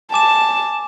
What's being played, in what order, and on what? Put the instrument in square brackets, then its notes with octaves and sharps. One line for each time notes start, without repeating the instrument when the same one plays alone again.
[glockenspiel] G#5 D6 E7 [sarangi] A5